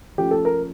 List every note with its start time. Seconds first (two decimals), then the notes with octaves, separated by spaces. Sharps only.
0.18 F3 A3 C#4 G4
0.31 A4
0.45 A#4